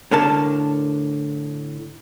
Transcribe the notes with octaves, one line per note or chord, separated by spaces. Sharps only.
A2 D3 A#4 A5